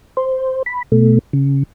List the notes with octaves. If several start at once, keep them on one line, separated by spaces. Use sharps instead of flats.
C5
B5
B2 A3
C#3